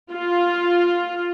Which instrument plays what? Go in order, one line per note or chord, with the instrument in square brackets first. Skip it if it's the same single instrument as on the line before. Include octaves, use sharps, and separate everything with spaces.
[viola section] F4